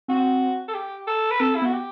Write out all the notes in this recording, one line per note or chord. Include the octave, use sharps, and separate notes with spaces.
C4 F#4
A4
G4
A4
B4
C4 A4
E4
B3
F#4
G4